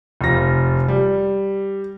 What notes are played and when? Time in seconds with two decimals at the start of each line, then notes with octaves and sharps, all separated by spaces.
0.21 F1 F4 A#6
0.88 G3